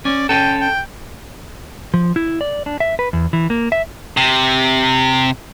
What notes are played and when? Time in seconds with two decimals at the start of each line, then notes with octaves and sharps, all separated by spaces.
0.05 C#4 D5
0.29 C#4 A4 G5
0.61 G5
1.94 F3
2.16 E4
2.41 D5
2.66 D4
2.80 E5
2.99 B4
3.13 E2
3.33 E3
3.50 A#3
3.72 E5
4.17 C3